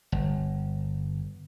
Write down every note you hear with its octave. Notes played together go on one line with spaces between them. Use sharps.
G1